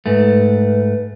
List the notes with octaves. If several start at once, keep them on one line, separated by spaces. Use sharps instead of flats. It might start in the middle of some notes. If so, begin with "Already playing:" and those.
G#2 A3 B4